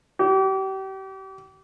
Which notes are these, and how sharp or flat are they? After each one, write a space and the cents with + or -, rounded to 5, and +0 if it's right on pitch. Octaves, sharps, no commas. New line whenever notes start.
G4 -35